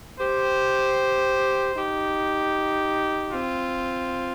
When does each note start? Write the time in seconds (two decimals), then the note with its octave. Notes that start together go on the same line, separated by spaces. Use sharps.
0.19 G4 C5
1.76 D#4 G4
3.32 C4 F4